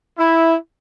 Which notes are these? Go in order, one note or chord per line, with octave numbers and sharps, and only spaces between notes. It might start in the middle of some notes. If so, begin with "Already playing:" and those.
E4